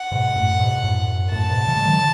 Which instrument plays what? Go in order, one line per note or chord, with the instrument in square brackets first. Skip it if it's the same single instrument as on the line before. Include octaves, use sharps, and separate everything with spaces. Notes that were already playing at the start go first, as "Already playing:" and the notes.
Already playing: [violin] F#5
[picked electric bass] G#2 B2
F#2 A2
G#2 B2
F#2 A2
F#2
[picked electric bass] F#2 A2 [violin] A5
[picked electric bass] G#2 B2
C#3 E3
G#3
D#3 F#3